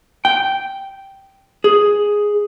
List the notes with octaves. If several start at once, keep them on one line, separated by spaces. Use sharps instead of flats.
G5
G#4